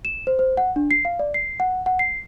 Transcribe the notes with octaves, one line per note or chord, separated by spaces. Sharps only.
E7
C5
C5
F#5
D4
C7
F5
D5
C7
F#5
F#5
C7